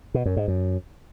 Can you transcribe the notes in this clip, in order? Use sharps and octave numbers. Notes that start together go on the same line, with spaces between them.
B2
F#2
G#2
F#2